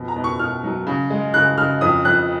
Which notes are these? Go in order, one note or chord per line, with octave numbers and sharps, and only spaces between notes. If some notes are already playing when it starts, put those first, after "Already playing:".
Already playing: F2 B2
A#5
B2
C#6
B2 F6
F#3
C#3
G#3
C#3 F#6
C#3 F6
F2 D#6
F2 F#6